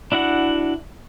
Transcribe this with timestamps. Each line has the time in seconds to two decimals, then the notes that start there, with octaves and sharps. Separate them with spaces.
0.12 D4 E4 F#4 F#5